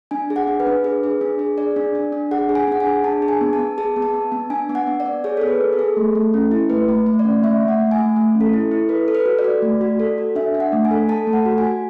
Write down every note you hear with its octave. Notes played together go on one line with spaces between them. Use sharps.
D4 G#5
G#4
F#5
D4
B4
D4
G#4
G#4
D4
G#4
G#4 D5
D4
D4
D4
G#4 F#5
G#4
G#5
D4 F#5
G#5
G#4
D4 A5
G#4
G#5
B3
A5
B3
G#4 A5
B3
A5
B3
B3
D4 G#5
B3
F#5
B3
D5
B3
G#4 C#5
G#4 A4
B4
B3
A4
G#4
A3
A3
C#4
E4
A3 B4
A3
A3
D5
C#4
A3 E5
A3
F#5
A3
G#5
A3
A3
C#4
A4
E4
E4
A4 B4
A4
B4
F#4
D5
F#4
A3
F#4
A4
F#4
D4 E5
D4
F#5
A3
G#5
A4
A4 A5
A3
F#5
F#4
G#5
F#4